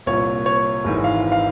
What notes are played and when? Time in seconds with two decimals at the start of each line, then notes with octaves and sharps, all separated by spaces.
0.06 C2 A#2 C#5
0.46 C#5
0.84 G#1 G#2 E3
1.04 F5
1.32 F5